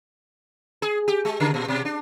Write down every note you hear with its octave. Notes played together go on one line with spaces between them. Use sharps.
G#4
G4
G#3
C#3
A#2
B2
D4